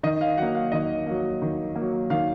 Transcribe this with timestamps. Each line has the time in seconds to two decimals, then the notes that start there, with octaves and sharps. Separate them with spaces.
0.03 D#3 D#5
0.21 F5
0.37 F#3 A#3 F#5
0.55 F5
0.72 D#3 D#5
1.06 F#3 A#3
1.42 D#3
1.76 F#3 A#3
2.10 D#3 F5